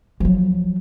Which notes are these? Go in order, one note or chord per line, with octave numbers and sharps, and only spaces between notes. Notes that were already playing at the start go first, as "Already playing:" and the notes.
F3 F#3